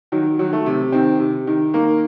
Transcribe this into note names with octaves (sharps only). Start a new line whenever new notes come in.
D#3 F#3
D#3 F#3
A3
C3
D#3 C4
C3
D#3
D#3 A#3